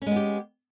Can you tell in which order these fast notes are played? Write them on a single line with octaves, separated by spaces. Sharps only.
C#4 G#3 B3 G4